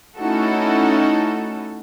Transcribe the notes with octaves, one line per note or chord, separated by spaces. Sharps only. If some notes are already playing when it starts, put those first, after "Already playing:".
A3 C#4 D#4 E4 F#4 A4